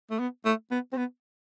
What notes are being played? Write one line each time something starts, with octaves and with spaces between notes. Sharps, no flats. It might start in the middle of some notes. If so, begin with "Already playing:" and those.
A3
B3
A3
B3
C4
B3